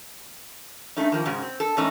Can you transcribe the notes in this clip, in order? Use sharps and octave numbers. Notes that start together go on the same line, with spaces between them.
G2 A3 C#4 D#4
D#3 F3 A#3
G#2 C#3 G#3 C#4 F#4
C4
A4
E2 G#2 A3 C#4 D#4